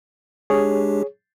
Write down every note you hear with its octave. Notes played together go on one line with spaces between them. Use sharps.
G#3 D4 G4 G#4 C#5